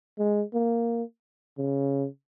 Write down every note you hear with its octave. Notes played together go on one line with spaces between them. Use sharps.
G#3
A#3
C#3